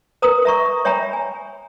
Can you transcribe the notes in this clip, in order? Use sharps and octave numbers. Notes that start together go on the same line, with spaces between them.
A#4 B4 A#5 D#6
E5 A#5 C#6
C#5 E5 G5 G#5 A#5 B5
G#5